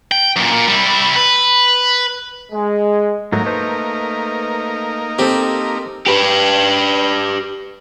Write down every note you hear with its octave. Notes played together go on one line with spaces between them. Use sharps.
G5
F#2 A#2
A#2
G3 E4
B4
G#3
G#2 F#3 A3 A#3 D#4 A#4
A3 B4 C5
C4 G4 A4
G4 B4